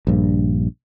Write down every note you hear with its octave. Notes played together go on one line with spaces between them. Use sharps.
A#1 G2